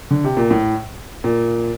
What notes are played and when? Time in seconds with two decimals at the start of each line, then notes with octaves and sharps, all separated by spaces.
0.11 D3
0.24 C3
0.37 A#2
0.51 A2
1.24 A#2